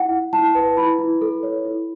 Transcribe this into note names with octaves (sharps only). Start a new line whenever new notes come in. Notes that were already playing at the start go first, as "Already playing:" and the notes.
Already playing: E4 F#5
E4
E4 A5
B4
E4 B5
E4
A4
C#5
E4